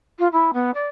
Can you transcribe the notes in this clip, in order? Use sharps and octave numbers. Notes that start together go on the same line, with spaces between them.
F4
E4
B3
D5